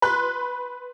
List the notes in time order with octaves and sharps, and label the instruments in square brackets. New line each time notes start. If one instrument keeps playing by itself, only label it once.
[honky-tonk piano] B4 B5 C6 F#6